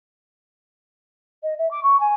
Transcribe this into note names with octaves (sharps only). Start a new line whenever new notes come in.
D#5
E5
D6
C#6
G#5